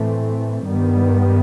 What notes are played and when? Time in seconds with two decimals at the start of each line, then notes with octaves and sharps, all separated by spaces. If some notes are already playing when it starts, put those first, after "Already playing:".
Already playing: A2 E3 A3 C4
0.65 G2 D#3 G3 B3